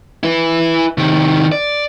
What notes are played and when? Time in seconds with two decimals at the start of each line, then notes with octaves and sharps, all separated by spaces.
0.23 E4 B4
0.98 C3 D#3
1.52 D5